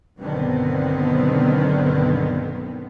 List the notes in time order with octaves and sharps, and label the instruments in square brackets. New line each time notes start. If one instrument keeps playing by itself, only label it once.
[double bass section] B1 G2 D3 D#3 B3 C4